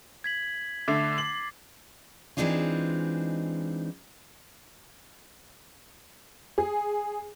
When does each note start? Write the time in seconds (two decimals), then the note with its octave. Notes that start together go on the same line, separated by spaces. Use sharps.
0.24 G#6 B6 F#7
0.88 D3 A3 D6 A6 C7
1.18 F#7
2.37 E3 G#3 C4 D4 D#4 F4
6.58 G#4